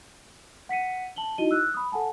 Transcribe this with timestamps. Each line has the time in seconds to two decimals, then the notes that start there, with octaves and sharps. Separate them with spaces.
0.69 F#5 B6 C#7 D#7
1.16 A5 F#7 G7
1.38 D#4 E4 F#4 D#5 D#7 G7
1.51 E6 F#6
1.74 B5 D#6
1.92 A4 F#5 G#5 A5